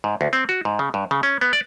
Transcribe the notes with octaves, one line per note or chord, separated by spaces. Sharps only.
G#2
D2
C4
F#4
G#2
C#3
G2
C#3
C#4
B3
D5